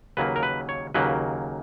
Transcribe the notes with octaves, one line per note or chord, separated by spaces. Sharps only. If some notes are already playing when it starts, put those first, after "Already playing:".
D#2 C#3 F#3 A#3 B4
A#4
B4
C#5
D#2 C#3 F#3 A#3 B4